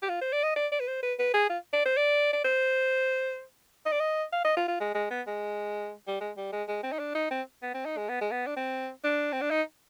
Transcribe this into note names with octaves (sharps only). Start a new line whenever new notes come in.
G4
F4
C5
D5
D#5
D5
D5
B4
C5
B4
B4
G#4
F4
D5
C5
D5
D5
C5
D#5
D5
D#5
F5
D#5
F4
F4
G#3
G#3
B3
G#3
G3
G#3
G3
G#3
G#3
C4
D#4
D4
D#4
C4
B3
C4
D#4
G#3
B3
G#3
B3
D4
C4
D4
C4
D4
D#4